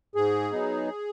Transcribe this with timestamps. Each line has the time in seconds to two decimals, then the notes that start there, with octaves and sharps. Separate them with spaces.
0.15 G#2 G#4
0.52 F#3 B3 D#4